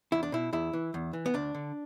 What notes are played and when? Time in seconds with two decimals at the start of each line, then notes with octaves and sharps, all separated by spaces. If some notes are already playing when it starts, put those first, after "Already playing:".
0.12 E2 E4
0.23 D4
0.32 B2 E4
0.53 E2 E4
0.73 E3
0.94 E2
1.13 E3
1.26 B3
1.34 D2 D4
1.54 D3